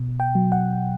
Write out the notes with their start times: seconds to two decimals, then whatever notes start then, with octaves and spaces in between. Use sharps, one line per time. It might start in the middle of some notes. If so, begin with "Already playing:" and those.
Already playing: B2
0.20 G5
0.35 F#3
0.52 F#5